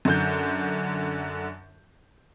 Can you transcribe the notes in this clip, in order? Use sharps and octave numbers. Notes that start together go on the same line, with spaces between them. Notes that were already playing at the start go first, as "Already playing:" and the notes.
F#2 D3 G6